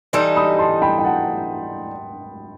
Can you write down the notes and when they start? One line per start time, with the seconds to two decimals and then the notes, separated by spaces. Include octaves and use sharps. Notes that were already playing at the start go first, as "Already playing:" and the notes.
0.13 E3 G3 D#4 A4 A5 C6
0.36 B5 D#6
0.59 A5 C6
0.82 G5 B5
0.99 G5
1.04 F#5 A5